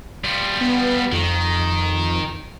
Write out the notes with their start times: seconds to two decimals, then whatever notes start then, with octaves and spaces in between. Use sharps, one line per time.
0.24 G3 F4
0.61 B3
1.12 F2 D#3